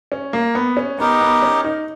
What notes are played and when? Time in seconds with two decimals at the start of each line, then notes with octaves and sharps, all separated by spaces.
0.12 C#4
0.33 A#3
0.55 B3
0.77 C#4
0.98 B3 D#4 G4 A#4 D#5
1.21 B3
1.42 C#4
1.64 D#4